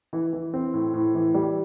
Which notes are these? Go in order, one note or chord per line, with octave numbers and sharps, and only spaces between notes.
E3
E3
C4
A2
A2
E3
G3